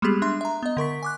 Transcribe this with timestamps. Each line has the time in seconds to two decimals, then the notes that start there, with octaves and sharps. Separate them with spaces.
0.02 G3 G#3 A#3 B3 G4 G#4
0.22 D4 E5 C6
0.41 E5 A#5
0.63 B3 D#5
0.77 D3 A#4 C#6 B6
1.03 G#5 D6 F#6